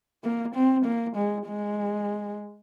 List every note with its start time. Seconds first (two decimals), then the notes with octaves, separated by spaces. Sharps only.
0.24 A#3
0.55 C4
0.85 A#3
1.16 G#3
1.47 G#3